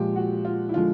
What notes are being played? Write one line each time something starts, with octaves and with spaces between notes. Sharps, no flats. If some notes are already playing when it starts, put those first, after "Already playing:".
Already playing: A#2 F3 G#3 G4
F#4
F4
E4
D3 F3 G#3 F4